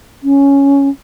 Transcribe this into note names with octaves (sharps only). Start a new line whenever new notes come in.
C#4